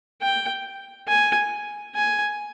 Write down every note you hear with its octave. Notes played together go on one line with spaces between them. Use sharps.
G5
G#5
G#5